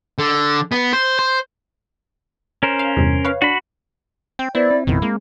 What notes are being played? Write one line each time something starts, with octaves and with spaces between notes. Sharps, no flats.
D3
B3
C5
C5
C#4 A#4 C5
F5
E2 G2 C3
B4 C#5 F5
D4 F#4 B5
C4 G5
B3 E4 C5 D5
C4
A1 F2 B2 D#3 E4
G#3 A#3